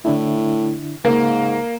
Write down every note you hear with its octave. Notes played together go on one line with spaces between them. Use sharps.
A2 D3 D4 E4
G#2 C#3 A#3 F5